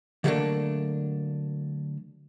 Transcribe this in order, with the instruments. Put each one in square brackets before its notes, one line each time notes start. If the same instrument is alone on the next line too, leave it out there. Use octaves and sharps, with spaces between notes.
[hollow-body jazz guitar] D3 F#3 G3 A3 A#3 D4